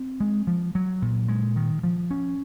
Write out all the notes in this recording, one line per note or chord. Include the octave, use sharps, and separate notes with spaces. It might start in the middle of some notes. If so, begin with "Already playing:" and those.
Already playing: C4
G#3
F3
F#3
A#2
G#3
D#3
F3
C#4